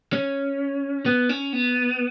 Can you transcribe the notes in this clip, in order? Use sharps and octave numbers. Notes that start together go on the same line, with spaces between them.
C#4
B3
C#4
B3